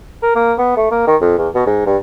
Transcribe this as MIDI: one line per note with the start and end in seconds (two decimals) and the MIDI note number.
0.22 0.33 70
0.35 0.53 58
0.58 0.72 59
0.76 0.88 57
0.91 1.06 58
1.07 1.16 51
1.21 1.34 41
1.38 1.48 40
1.55 1.62 47
1.66 1.82 44
1.86 1.96 43